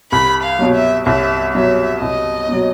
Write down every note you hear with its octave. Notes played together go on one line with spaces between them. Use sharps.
C2 B5
F5
B2 F#3
E5
C2 E5
B2 F#3 E5
C2 D#5
B2 F#3